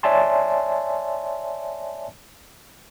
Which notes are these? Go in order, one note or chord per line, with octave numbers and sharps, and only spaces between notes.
C#5 D5 E5 G#5 A5 C6